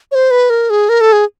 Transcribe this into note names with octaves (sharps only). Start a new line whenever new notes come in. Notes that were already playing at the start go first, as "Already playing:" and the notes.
C#5
C5
B4
A#4
G#4
A#4
A4
G#4